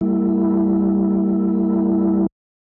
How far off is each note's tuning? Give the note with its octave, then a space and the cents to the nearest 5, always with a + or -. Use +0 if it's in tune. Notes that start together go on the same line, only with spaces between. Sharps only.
G3 +5 A#3 -35 E4 +0